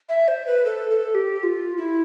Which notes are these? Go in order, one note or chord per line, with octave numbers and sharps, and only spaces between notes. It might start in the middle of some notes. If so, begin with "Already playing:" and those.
E5
C5
B4
A4
A4
G4
G4
F4
E4